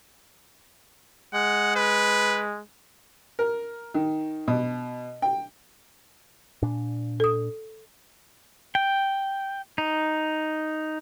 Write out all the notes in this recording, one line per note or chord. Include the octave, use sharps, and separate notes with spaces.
G#3 F#5
B4
A#4
D#3
B2
G5
A#2 D4
A4 D#6
G5
D#4